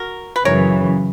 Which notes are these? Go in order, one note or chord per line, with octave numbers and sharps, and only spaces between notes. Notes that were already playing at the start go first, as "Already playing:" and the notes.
Already playing: F#4 A#4
B4
F#2 C#3 E3 A#4 C#5